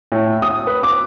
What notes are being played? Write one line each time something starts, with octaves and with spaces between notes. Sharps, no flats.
A2
D#6
B4
D6